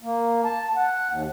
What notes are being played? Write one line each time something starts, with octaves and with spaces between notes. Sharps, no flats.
A#3
A5
F#5
D#2